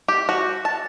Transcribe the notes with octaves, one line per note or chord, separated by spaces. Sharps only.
G4
F#4
A5